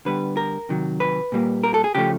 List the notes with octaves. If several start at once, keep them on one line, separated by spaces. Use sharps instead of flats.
D3 G3 B3 B4
A#4
C3 D#3 F#3
B4
A#2 G3 A#3
A#4
A4
G#4
C#3 F3 A3 G4